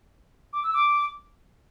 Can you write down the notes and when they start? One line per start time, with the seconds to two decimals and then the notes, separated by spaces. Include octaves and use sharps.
0.53 D6
0.63 E6
0.74 D6